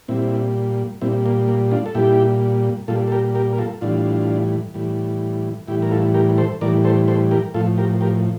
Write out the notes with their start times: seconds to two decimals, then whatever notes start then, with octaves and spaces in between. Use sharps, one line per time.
0.08 A#2 G3 C4 E4
1.01 A#2 G3 C4 E4
1.26 A#3
1.48 A#3
1.71 D4 F4
1.86 A4
1.95 A#2 G3 E4 G4
2.88 A#2 G3 F4 A4
3.07 A4
3.12 G4 A#4
3.35 G4 A#4
3.53 A#4
3.58 F4 A4
3.81 A2 E3 G3 D4 F4
4.74 A2 E3 G3
5.68 A2 E3 G3 E4 G4
5.82 A#4
5.91 F4 A4
6.14 G4 A#4
6.38 A4 C5
6.61 A2 E3 G3 A#4 D5
6.84 A4 C5
7.08 A4 C5
7.31 G4 A#4
7.54 A2 F3 F4 A4
7.78 G4 A#4
8.01 G4 A#4